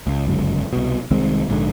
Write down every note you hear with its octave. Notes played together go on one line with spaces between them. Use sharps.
C#2
G1 C#2 F#2
C2 B2
C2 D#3 G#3 C4
A#1 G#2 B2 D3